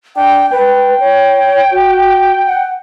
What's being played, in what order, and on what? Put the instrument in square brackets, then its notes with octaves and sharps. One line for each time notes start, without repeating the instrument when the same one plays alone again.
[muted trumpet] D4 [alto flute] G5
[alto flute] B4 [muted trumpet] G5
[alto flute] C#5
F#4
F#5